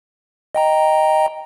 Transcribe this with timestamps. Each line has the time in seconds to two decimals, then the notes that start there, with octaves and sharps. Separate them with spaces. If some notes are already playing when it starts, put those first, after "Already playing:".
0.55 D#5 G5 A#5